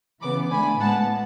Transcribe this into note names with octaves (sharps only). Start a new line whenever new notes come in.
C#3 E3 B3 B5 D6
D3 A3 G#5 B5
A2 G#3 B3 F#5 A5